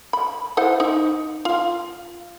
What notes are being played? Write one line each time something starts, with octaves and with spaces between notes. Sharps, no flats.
B5
E4 C5 F#5
D#4
F4